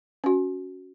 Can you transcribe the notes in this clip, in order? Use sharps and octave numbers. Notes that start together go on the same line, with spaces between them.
C#4 F#4